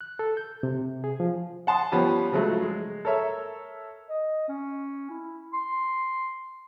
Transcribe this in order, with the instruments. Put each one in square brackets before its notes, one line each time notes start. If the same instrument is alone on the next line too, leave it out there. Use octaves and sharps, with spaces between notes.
[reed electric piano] F#6
A4
G6
C3
G#4
F3
[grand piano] F#5 A5 C6 D#6
F3 G3 B3 C#4 G4
C#3 F3 F#3 G#3 A3
G#3
A4 A#4 C#5 E5
[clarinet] D#5
C#4
E4
C6